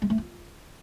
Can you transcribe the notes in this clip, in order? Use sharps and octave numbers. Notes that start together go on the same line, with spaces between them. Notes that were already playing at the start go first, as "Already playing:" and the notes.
G#3
A3
F4